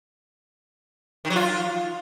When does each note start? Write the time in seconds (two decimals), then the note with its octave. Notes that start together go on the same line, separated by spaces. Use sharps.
1.25 D#3
1.30 F#3
1.36 F4